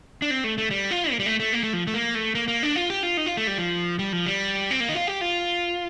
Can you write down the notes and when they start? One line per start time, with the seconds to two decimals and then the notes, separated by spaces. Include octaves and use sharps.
0.22 D4
0.31 C4
0.44 A3
0.58 A3
0.71 G3
0.91 F4
1.12 A#3
1.19 G3
1.26 A3
1.40 A3
1.53 A#3
1.63 A3
1.73 F3
1.87 A3
1.94 A#3
2.15 A3
2.35 A#3
2.48 A#3
2.63 D4
2.76 F4
2.90 G4
3.03 F4
3.17 D#4
3.26 F4
3.37 A3
3.47 G3
3.58 F3
3.99 G3
4.13 F3
4.26 G3
4.71 C4
4.80 A#3
4.89 D#4
4.95 F4
5.07 G4
5.21 F4